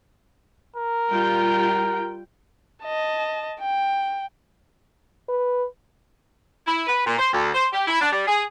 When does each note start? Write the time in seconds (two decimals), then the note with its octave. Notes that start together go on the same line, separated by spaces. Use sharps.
0.76 A#4
1.11 G3 F4 G5
2.83 D#5 A5
3.60 G5
5.29 B4
6.67 E4
6.87 B4
7.06 A#2
7.19 C5
7.33 D2
7.55 C5
7.73 G4
7.87 E4
8.01 D4
8.12 G3
8.27 G#4